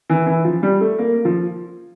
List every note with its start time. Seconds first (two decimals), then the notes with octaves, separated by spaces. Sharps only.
0.09 E3
0.27 E3
0.45 F3
0.63 G3
0.81 A3
0.99 A#3
1.25 F3